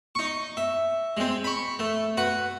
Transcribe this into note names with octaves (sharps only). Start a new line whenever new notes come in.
D#4 C#6
E5
G#3 C4
B5 C#6
A3
F#4 B4